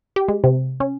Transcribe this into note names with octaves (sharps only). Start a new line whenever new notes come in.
G4
G#3
C3
C#4